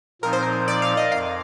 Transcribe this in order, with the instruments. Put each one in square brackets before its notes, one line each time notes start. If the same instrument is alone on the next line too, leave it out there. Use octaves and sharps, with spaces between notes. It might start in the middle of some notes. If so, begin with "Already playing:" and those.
[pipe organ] A#2 F3 C4 D#4 [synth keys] A#4
[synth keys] C5
A#4
D5
F5
D#5
[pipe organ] F2 [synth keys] F5